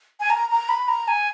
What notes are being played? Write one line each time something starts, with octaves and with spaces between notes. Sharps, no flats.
G#5
A#5
A#5
B5
A#5
G#5